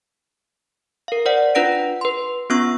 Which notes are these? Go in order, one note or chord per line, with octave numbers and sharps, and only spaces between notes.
A#4 F5
C5 D5 F#5
D4 F4 B4 F#5 A#6 D7
B4 C6
B3 C#4 F4 C#6 E6